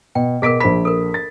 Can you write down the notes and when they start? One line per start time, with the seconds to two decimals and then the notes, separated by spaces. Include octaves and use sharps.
0.15 B2 G5
0.42 B2 G#4 A#4 B6 D7
0.60 A#1 C5 B5 B6
0.85 A4 A#4
1.14 A6